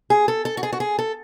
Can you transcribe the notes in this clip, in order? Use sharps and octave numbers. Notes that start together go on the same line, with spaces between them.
G#4
A4
A4
F#4
G#4
F#4
G#4
A4